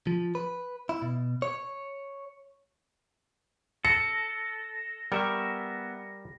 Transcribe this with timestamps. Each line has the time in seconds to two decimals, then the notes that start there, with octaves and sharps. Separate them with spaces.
0.07 F3
0.35 B4
0.89 E4
1.02 B2
1.42 C#5
3.85 A4 A#6 C#7
5.12 G3 B3 A#4 E5 C#6